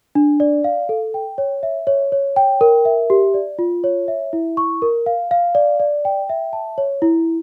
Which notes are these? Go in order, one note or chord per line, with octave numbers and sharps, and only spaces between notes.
D4
D5
F5
A4
G5
C#5
E5
C#5
C#5
G5
A#4
E5
G4
D5
F4
C#5
E5
E4
C#6
A#4
F5
F5
D5
D5
G5
E5
A5
C#5
E4